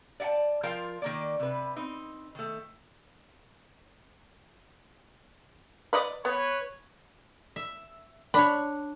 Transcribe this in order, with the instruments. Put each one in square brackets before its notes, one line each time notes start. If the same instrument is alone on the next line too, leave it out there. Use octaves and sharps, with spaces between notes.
[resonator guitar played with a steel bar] D5 E5 F#5 G5 A5
F3 F4 A#4 F5 G5
D#3 A#3 D5
C3 B4
C4 D#4
D#3 A3
[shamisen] B4 D5 D#5
[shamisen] B3 [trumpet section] B4 C#5
[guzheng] E5
[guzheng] D4 C#5 [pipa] B5